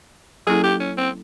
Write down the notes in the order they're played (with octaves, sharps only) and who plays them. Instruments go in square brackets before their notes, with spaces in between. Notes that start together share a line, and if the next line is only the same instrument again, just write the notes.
[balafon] F#3 A#3 C#4 E4 A4 [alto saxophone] G#4
[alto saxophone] G4
C#4
C4